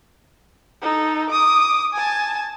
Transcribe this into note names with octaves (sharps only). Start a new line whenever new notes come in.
D#4 A4
D6 D#6
G#5 A5